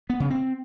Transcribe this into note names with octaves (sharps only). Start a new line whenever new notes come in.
B3
C#3
C4